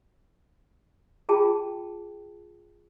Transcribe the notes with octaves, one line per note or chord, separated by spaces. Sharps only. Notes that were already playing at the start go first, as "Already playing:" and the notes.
F4 G#4 G5 A5